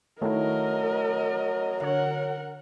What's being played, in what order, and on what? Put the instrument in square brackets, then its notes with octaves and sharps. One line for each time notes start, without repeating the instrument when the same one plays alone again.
[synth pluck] D#3 E4 [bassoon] F#3 [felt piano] A3 [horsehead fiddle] A#4 D#5
[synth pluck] D3 C#5 [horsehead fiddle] A#4 F#5